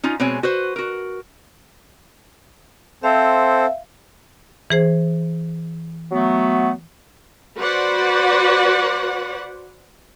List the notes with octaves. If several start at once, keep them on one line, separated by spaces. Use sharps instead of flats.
C#4 D#4 F4
B2 G#3 C4 C#5 G#5
F#4 B4 C5
F#4 A#4
C4 A4 C5 E5 F5
E3 G#4 C5
F#3 A3 B3
F#4 B4 C5 D5 F#5